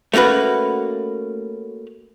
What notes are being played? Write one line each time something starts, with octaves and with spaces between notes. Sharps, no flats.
A3 A#3 C#4 F#4 B4